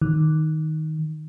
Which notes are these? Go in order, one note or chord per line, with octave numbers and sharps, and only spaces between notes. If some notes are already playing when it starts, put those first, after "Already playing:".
D#3